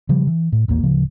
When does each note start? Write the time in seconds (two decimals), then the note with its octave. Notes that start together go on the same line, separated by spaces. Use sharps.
0.09 C#3 F3 G3
0.27 E3
0.52 A2
0.68 A1 D#2 A#2 A#3
0.83 D1 C#3 F3